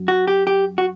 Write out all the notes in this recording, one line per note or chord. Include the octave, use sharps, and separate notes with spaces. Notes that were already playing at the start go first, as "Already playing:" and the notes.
Already playing: F#2 F#3
F#4
G4
G4
F#4